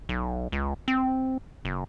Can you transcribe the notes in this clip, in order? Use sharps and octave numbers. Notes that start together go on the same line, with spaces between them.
B1
C#2
C4
F#1